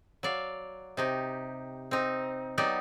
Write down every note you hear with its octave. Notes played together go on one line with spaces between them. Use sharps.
F#3 D5 F5
C3 D#4 G4
C4 D#4
F#3 B3 D#4 G4 D5